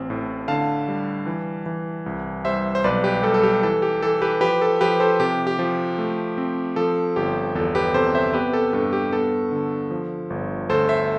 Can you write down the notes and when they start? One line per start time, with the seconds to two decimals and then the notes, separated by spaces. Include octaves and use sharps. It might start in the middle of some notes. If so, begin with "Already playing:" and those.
Already playing: A1 C4
0.10 A2
0.48 D3 F5 A5
0.88 G3
1.26 E3
1.66 E3
2.06 C2
2.45 G3 C5 E5
2.75 C5
2.84 B1 B4 D5
3.04 G4 B4
3.23 G3 A4
3.34 A4
3.43 G4
3.63 E3 A4
3.82 G4
4.02 E3 A4
4.22 G4 B4
4.41 F3 G4 B4
4.62 A4
4.81 F3 G4 B4
5.00 A4 C5
5.20 C3 G4
5.47 G4
5.59 F3
5.99 A3
6.38 C4
6.76 F3 A4
7.16 G1 G4
7.55 E2 A4
7.75 G4 B4
7.94 C3 A4 C5
8.15 C5 E5
8.34 B3 G4 B4
8.53 A4
8.73 G2 A4
8.93 G4
9.12 B3 A4
9.51 D3
9.91 F3
10.30 G1
10.69 D2 A4 C5
10.89 C5 E5